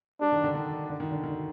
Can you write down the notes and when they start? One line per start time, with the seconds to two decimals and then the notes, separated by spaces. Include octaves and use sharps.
0.20 G3 D4
0.32 D#3
0.44 D3
0.55 D#3
0.89 D3
1.00 D#3
1.11 D3
1.23 D#3